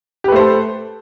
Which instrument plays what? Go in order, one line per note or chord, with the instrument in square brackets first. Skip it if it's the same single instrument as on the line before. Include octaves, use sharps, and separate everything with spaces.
[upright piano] G4
B4
A3
C5
A4